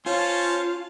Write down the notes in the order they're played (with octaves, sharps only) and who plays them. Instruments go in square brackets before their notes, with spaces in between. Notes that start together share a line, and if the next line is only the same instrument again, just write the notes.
[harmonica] C#4 C5 A5 [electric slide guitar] F4 [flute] C#5